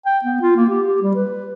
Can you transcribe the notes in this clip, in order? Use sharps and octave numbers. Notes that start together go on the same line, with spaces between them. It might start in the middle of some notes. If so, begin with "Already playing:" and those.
G5
B3
F4
A#3
G4
G4
G3
B4